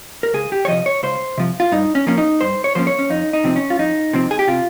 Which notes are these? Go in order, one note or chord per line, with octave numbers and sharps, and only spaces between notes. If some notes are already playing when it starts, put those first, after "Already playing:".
A#4
C#2 G#4
G4
C#5
C3 F3 D#5
C#5
C#2 C5
C3 F3
F4
G2 D#4
C#4
F3 A#3 C#4
D#4
G2 C5
C#5
F3 A#3 C#4 C5
C#5
C#4
F2 D#4
D#4
C3 F3 C4
C#4
F4
F2 D#4
C3 F3 C4
G#4
G4
C3 F4